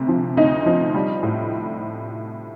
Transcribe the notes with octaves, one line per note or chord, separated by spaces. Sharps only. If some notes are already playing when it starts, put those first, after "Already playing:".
Already playing: D2 C3
F3
D2 D#4
F3
G3
A2